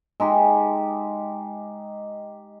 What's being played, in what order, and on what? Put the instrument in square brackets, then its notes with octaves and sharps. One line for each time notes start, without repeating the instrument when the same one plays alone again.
[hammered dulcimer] G#3 D#4 G4